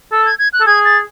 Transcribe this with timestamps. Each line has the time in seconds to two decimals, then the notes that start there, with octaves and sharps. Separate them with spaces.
0.12 A4 E6
0.26 G#6
0.39 G#6
0.53 F#6
0.60 A4
0.66 G#4 G#6
0.85 A6